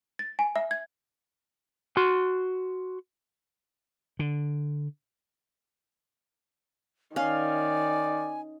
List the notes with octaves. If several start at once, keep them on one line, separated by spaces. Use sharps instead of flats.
A6
G#5
E5
G#6
F#4 C6
D3
D#3 C#4 D5 F5 G#5